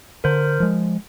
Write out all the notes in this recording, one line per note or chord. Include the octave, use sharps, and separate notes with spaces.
D3 A#4 C5
F3 G#3